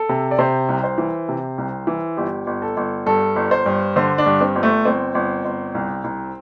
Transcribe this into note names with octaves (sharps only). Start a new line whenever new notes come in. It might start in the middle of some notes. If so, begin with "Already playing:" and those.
Already playing: A4
C3
D5
C3 C5
C2
C5
E3
C3
C2
E3
G1 G4
G1
A4
G1
G2 A4
G1
C5
G2
D3 C5
D4
G2
C4
G1
A3
G1 C4
G1
G1
C2
C2